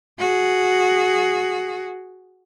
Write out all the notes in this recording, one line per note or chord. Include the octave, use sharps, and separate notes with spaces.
F#4 G#4